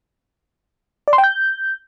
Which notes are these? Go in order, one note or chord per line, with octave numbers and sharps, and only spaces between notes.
D5
C6
G5
G6